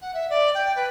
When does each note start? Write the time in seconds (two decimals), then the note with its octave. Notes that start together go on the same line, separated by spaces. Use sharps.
0.01 F#5
0.14 E5
0.29 D5
0.54 G5
0.75 B4